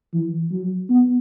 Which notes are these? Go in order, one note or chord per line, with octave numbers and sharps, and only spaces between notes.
E3
F#3
B3